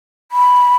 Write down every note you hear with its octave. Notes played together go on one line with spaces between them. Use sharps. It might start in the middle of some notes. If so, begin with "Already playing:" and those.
B5